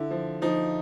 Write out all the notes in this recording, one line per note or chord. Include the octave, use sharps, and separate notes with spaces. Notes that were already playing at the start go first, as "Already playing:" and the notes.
Already playing: D3 E4
F3
F3 D#4